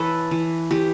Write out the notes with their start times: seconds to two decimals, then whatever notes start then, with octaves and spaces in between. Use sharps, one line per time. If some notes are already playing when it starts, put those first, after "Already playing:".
Already playing: E3 A4 B4 C#5
0.31 E3
0.71 E3 G4